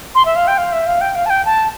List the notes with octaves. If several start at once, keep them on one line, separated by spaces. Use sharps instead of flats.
C6
E5
F5
G5
F5
E5
F5
G5
F5
A5
G5
A5